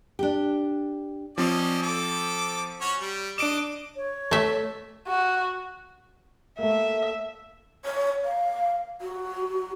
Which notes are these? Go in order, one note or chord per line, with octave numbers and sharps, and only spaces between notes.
D4 G4
F3 C4 C#4 D5 D#5
A4 D6
C#4 F#4 C#5
G3
D4 D#5 D6 D7 E7
C#5
A3 E5
F#4
A3 A#3 E5
C#5
F5
F#4